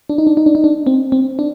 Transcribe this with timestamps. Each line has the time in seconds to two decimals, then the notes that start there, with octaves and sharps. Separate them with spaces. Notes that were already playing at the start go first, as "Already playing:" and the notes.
0.09 D4
0.18 D#4
0.27 D4
0.37 D#4
0.46 D4
0.55 D#4
0.64 D4
0.87 C4
1.12 C4
1.39 D4